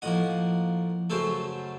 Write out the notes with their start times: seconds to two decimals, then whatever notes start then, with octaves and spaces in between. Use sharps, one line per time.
0.02 A2 F3 A#3 D#5 F#5
1.10 F#2 C#3 F#3 A3 A4 C5